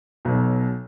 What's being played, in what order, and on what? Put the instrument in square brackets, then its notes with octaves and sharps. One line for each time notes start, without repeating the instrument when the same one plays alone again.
[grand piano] B1 B2 F#3